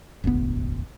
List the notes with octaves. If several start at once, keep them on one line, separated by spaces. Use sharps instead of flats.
E1 A1 D2 B3